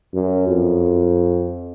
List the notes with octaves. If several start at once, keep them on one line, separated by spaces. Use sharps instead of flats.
F#2
F2